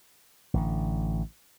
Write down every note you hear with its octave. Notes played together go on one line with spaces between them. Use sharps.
A1 D3